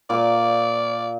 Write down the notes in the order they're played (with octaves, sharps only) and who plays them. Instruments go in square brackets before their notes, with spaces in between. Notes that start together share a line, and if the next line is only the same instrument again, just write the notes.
[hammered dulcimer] A#2 D6 [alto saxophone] D5